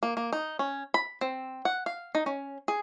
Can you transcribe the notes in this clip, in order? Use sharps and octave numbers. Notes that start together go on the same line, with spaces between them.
A#3
A#3
D#4
C#4
B5
C4
F#5
F5
D#4
C#4
G#4